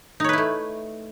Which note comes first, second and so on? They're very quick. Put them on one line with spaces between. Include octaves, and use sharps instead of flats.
D#4 C#5 B4 E4 A3